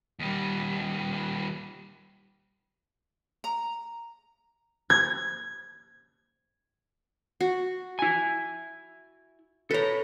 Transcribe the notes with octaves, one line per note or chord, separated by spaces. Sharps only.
D#2 G3
A#5
G#6
F#4
E4 G#5
A4 B4 C#5 A#5